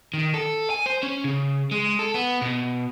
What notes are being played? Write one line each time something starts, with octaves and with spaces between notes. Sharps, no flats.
D#3
A4
G#5
C5
C#4
C#3
G#3
A4
B3
B2